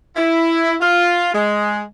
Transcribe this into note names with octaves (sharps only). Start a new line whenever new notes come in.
E4
F4
G#3